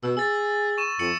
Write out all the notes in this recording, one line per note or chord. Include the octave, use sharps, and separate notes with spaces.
B2 E6
G#4 E6 A6
C#6 E7
F2 C#7 F#7